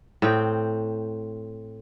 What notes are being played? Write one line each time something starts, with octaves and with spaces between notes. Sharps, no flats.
A2 C4 G5